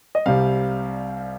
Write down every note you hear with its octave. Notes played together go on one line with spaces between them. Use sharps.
D#5
C2 C3 G3 F5